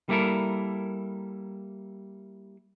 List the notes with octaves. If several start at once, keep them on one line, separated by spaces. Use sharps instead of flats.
G3 A#3 E4 A4 A#4